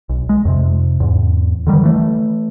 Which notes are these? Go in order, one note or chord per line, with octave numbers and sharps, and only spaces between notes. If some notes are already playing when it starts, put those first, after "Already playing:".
B1
G#3
F2 C3
E2 G#2
D3 D#3 G3
E3 A3